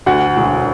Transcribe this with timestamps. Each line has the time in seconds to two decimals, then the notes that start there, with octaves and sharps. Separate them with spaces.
0.06 D2 F#5
0.37 E1